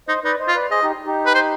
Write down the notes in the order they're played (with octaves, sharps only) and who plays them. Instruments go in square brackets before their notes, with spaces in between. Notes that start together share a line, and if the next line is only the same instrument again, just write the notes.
[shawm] D#4 [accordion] C5 D#5
[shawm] D#4 [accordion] B4 D5
[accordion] C5 D#5
[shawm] F4
[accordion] B4 D5
[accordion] G#4 C5 [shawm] D#5
[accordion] D#4 G4
D#4 G4
[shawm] B4
C5